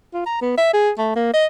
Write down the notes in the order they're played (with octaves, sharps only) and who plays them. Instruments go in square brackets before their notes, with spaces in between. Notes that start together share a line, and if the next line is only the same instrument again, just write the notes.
[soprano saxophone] F4
A#5
B3
E5
G#4
A3
A#3
D#5